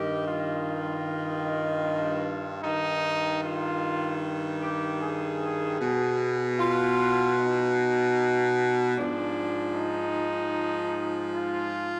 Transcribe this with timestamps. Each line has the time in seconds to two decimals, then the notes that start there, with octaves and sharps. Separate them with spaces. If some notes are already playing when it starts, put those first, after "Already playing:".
Already playing: G2 D#3 G4
0.26 F4
2.63 G2 D#3 D#4
3.42 F4
4.61 G4
5.00 G#4
5.79 B2
6.59 F4
7.38 D#4
8.96 G#2 F3 D4
9.75 D#4
11.34 F4